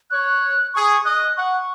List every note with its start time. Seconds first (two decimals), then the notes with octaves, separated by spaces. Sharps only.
0.10 C#5 F#6
0.74 G#4 C#6
1.05 D#5 F#6
1.36 F#5 C#6